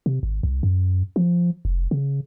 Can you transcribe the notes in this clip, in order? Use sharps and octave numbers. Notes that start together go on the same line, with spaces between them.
C3
G#1
C2
F#2
F3
F1
C#3